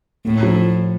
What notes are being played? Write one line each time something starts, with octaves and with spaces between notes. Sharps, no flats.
A2 A3
F3